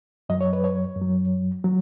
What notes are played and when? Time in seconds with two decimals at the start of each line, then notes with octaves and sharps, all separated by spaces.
0.29 F#2 F#3 D#5
0.41 C#5
0.53 B4
0.64 C#5
0.96 F#2
1.02 F#3
1.64 F#3